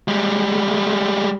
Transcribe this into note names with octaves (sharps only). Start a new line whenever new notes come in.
G3 G#3